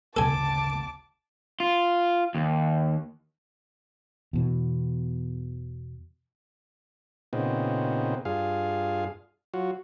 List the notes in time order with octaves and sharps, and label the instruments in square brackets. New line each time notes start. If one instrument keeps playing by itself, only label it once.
[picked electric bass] G#1 D2 C#3 [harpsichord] A4 G#5 [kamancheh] A5 D6
[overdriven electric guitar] F4
D#2
[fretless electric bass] E2 B2 E3
[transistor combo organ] A#2 C#3 B3 C4 D#4
G2 F4 G#4 F5
F#3 F4 F#4